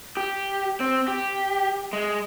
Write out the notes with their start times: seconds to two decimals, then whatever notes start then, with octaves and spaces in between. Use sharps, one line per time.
0.17 G4
0.80 C4
1.08 G4
1.93 G#3